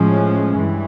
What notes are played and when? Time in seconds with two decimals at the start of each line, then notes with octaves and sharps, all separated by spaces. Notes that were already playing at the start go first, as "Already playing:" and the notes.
Already playing: A2 F3 G#3 C#4
0.56 G2 E3